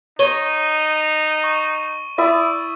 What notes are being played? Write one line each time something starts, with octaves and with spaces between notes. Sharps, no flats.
D#4 C#5 D#7 G7
C#6
E4 D5 E5 D#6